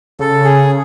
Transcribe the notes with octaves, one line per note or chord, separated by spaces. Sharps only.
C#3 A4
G#4